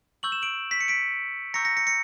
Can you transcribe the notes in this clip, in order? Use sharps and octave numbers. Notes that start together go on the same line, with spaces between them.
C#6 E6 G6 F#7
E7
D7 F#7
B6
C#7
B6 D7
A#5 C#6 E6 G6 A#6 C#7
A#6 C#7
A#6 C#7
A#6 C#7